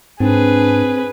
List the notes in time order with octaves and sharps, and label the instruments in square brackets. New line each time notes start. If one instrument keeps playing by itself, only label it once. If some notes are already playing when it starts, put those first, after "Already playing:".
[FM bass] G#2 [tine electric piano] C4 [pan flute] D4 [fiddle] G#4 B4